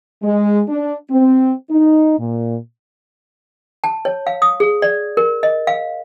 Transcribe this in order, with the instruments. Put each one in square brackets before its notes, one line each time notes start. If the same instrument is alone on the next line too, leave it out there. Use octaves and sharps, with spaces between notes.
[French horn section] G#3
D4
C4
D#4
A#2
[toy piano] A5
C#5
F5
D#6
G#4
D5
A#4
D#5
F5